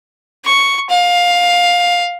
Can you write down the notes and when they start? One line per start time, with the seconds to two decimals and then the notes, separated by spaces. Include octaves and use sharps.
0.45 C#6
0.90 F5